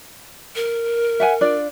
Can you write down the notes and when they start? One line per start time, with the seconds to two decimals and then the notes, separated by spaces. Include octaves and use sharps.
0.55 A#4
1.20 E5 F#5 G#5
1.41 D4 F4 D5